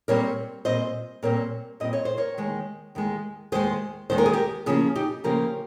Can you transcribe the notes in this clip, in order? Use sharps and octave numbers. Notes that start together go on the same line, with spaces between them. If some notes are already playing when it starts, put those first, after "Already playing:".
A#2 G3 C4 A#4 C#5
A#2 G3 C4 C5 D#5
A#2 G3 C4 A#4 C#5
A#2 G3 C4 D#5
C#5
C5
A#4 C#5
D#2 D#3 G#3
D#2 D#3 G#3
D#2 D#3 G#3 G#4 C5
D#2 D#3 G#3 C5
A#4
G#4
G4 A#4
C#3 F3 A#3 C#4 F4 G#4
D#4 G4
C#3 F3 A#3 C#4 G4 A#4